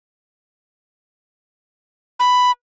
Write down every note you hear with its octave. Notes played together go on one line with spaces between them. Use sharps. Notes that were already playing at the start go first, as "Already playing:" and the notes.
B5